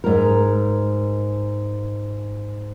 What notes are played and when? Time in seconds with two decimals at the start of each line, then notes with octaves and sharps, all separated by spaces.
0.04 G#2 A#4